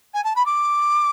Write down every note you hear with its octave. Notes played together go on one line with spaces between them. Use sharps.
G#5
A5
B5
D6